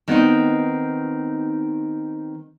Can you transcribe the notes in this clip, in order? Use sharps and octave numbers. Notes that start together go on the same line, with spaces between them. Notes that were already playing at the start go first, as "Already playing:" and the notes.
D#3 B3 C4 D#4